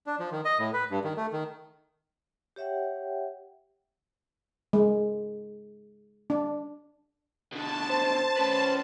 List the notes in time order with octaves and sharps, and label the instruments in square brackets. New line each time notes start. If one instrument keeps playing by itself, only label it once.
[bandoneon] D4
F3
D#3
D#5
A2
B4
G2
D#3
A3
D#3
[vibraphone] G4 C#5 E5 F#5 G5
[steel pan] G#3
D4
[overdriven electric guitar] B2 D3 [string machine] A5
[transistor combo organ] C5
[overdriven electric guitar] C#4 B4